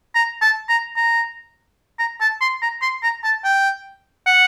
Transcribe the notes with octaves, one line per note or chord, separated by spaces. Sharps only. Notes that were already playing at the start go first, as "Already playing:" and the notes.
A#5
A5
A#5
A#5
A#5
A5
C6
A#5
C6
A#5
A5
G5
F#5